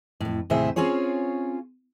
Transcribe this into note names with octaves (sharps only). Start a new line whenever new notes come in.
F2 A2
D#2 A2 C3 G#4 C5 E5
C4 C#4 F4 G#4 C#5